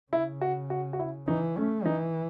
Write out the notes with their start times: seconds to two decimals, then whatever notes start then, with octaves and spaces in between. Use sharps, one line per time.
0.12 C#3 E4
0.41 F#4
0.70 F#4
0.93 F#4
0.99 E4
1.28 E3 D#4
1.57 A3 C#4
1.85 E3 D#4